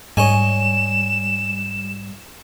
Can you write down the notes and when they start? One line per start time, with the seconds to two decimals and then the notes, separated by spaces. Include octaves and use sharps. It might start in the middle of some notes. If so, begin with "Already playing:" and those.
0.17 G#2 G3 C#5 D#5 G#5 E7